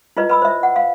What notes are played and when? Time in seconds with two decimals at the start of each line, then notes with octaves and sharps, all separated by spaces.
0.17 E4 F4 B4 D#5
0.29 B4 B5 E6
0.42 C5 E5
0.63 F#5
0.76 F5